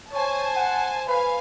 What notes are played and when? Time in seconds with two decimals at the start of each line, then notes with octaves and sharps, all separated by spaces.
0.13 C5 C#5 G#5 A5
0.56 F#5
1.08 B4 F5 G#5